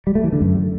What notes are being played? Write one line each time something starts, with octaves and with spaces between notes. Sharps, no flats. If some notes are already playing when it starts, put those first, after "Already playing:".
G3
A3
E3
D3
F#2